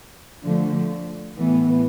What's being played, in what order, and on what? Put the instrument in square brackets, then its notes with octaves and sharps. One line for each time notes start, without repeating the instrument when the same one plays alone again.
[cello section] D3 F3 A3
A2 E3 B3